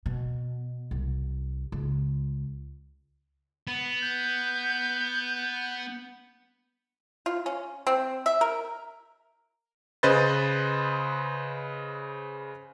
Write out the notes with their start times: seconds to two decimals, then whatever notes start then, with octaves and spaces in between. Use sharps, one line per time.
0.06 B2
0.91 C2
1.72 C#2
3.67 B3
4.02 G6
7.26 F4
7.46 C#4
7.87 C4
8.26 E5
8.41 A#4
10.03 C#3 B4 C5 D#5 C6 A6